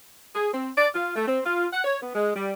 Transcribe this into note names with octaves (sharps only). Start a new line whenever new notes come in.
G#4
C4
D5
F4
A3
C4
F4
F#5
C#5
B3
G#3
G3